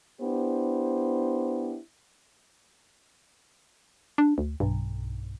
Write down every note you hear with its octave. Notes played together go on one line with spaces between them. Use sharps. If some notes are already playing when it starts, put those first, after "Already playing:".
B3 D4 E4 G4 C5
D4
D2
B1 G2